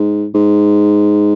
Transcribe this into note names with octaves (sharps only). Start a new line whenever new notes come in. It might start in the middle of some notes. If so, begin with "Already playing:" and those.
Already playing: G#2
G#2